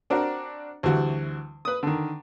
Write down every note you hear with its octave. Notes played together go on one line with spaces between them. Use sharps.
C4 D4 F#4 A#4
D2 E3 G3 F#4
B4 D#6
D3 D#3